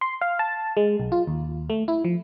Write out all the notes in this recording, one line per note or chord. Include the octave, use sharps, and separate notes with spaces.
C6
F5
A5
G#3
B1
F4
D#2
A3
E4
F3